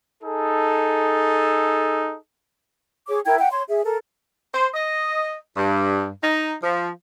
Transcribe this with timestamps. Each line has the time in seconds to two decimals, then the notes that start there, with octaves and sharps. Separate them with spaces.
0.23 D#4 G#4 A4
3.08 G#4 C#5 D6
3.26 E4 A#4 G5 G#6
3.38 F#5 G5
3.51 C#5 C6
3.69 G#4 E5
3.84 A4 A#4
4.54 C5
4.74 D#5
5.57 G2
6.22 D#4
6.62 F3